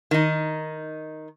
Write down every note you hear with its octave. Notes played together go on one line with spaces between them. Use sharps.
D#3 D#4